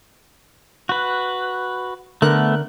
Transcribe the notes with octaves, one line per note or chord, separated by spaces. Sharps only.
F#4 B4
D3 A3 B3 A#4 F#6